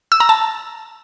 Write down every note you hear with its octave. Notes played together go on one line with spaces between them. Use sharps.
E6
A#5
A5